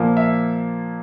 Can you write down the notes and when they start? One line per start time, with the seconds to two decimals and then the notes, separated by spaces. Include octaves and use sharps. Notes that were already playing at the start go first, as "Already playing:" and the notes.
Already playing: A#2 F3 A#3
0.17 E5